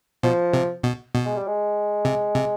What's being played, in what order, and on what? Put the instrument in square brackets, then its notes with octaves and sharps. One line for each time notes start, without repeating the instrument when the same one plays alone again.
[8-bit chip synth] B2 [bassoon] F3
[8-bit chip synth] C3
B2
B2
[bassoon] G#3
G3
G#3
[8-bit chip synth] C3
C3